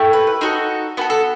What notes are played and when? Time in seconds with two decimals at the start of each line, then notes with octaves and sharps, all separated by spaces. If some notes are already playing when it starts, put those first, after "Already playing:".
Already playing: A3 E4 G4
0.13 B4
0.27 B4
0.41 D#4 F#4 A4 C5
0.97 B3 F#4 A4 B4
1.10 A4